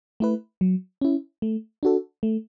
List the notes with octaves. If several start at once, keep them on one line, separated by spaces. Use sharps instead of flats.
A3 E4 B4
F#3
C#4 E4
A3
D4 F#4 A4
A3